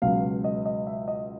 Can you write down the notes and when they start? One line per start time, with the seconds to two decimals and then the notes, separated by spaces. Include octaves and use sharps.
0.02 C#2 B2 F#3 F5
0.44 D#5
0.66 D#5
0.87 E5
1.08 D#5